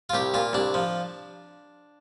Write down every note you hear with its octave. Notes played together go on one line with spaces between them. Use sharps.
F4
C2 G4
A#2 F4
C2 D4
F3